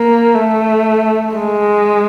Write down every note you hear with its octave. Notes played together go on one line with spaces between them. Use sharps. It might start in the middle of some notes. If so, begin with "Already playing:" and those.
Already playing: A#3
A3
G#3